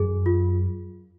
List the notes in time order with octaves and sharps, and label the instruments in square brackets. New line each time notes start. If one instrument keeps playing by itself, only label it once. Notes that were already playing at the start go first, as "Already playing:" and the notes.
Already playing: [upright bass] F#2 [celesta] G#4
[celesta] F4